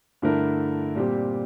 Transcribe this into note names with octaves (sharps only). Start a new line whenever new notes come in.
G2 D3 A3 E4 A#4
A#2 G3 C4 G4